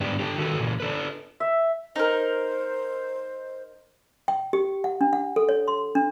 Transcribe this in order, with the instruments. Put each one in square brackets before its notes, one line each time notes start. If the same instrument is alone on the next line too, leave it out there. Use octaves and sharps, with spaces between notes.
[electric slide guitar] G#2 B3 D4 G4
D4 G4 A4 G5
D#3 F#4 G4 A4 B4
A#2 E3
D4 A4 B4
[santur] E5
[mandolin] D#4 A#4 [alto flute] C5
[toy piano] G5
G4
F#5
D4
F#5
A4
C#5
C6
D4